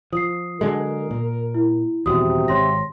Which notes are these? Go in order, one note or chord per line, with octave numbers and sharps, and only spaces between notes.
F3 D#6 C7
D3 F#3 G#3 A#4
A#2
E4
D#1 E2 C3 F#4 D#6
G#1 C#5 C6 A#6